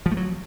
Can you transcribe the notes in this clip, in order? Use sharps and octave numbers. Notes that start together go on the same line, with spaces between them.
F3
A3
F#3